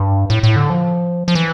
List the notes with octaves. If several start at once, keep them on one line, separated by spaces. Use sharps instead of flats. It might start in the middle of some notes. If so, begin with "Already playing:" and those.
Already playing: G2
A2
A2
D3
F3
F3
E3